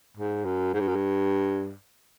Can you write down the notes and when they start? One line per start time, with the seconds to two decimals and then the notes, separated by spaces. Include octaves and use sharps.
0.17 G#2
0.45 F#2
0.73 G#2
0.80 G2
0.88 F#2
0.95 G2